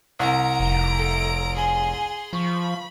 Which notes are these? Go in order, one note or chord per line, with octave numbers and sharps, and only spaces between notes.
C2 F#5 A#5 D7
F1
A4
G#4 G#5 C6
F3 B5 C#6